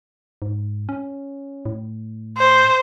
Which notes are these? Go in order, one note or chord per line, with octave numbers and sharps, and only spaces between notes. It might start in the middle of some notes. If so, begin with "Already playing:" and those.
G#2
C#4
A2
C5